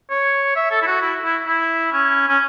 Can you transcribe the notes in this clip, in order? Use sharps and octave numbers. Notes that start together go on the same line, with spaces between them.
C#5
E5
A4
E4
F#4
E4
E4
E4
C#4
C#4